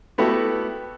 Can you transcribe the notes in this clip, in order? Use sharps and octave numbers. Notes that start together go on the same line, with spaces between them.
A3 B3 E4 F#4 G4 A4